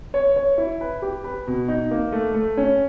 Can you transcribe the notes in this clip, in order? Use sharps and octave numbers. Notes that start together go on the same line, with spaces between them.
C#5
C#5
E4
B4
G4
B4
B2
D#4
A#3
A3
A3
C#4